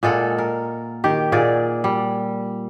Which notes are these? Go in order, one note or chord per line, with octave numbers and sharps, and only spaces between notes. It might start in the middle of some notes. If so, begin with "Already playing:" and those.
A#2 G#3 A4 F#5
A#4
D#3 G4
A#2 G#4 D5 F#5
G3